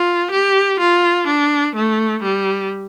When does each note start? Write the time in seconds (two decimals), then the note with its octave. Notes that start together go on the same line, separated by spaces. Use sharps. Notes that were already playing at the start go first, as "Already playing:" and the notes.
Already playing: F4
0.31 G4
0.80 F4
1.27 D4
1.75 A3
2.23 G3